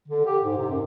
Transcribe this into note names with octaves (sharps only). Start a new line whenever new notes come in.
D3
G4
G#2
C3
F#2